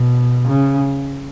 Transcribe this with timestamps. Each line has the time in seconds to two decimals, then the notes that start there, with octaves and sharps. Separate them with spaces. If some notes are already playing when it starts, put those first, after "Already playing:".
Already playing: B2
0.48 C#3